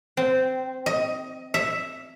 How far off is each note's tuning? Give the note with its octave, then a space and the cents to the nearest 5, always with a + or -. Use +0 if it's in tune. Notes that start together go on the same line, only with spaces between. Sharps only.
C4 -15
D#5 +15
E5 +0